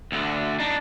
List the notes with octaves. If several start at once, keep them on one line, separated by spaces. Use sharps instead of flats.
D2 D3
D4 D#4